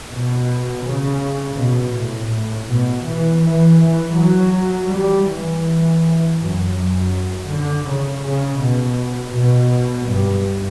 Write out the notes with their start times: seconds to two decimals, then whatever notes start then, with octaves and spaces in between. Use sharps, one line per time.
0.09 B2
0.84 C#3
1.57 B2
1.95 A2
2.31 A2
2.69 B2
3.05 E3
3.42 E3
3.80 E3
4.17 F#3
4.91 G3
5.28 E3
6.39 F#2
6.76 F#2
7.50 D3
7.87 C#3
8.24 C#3
8.61 B2
9.36 B2
10.09 G2